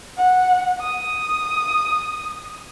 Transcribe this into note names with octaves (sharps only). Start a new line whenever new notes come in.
F#5
D#6